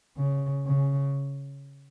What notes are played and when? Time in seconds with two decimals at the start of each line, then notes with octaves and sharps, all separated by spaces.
0.17 C#3
0.66 C#3